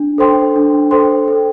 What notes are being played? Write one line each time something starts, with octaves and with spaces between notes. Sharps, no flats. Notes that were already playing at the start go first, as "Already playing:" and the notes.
Already playing: D4
A4 C5 G5 C6
D4
A4 C5 G5 C6
A4